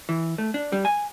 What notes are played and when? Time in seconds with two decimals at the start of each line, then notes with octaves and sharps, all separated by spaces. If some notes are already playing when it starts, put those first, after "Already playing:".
0.09 E3
0.38 A3
0.54 D4
0.72 G3
0.85 G#5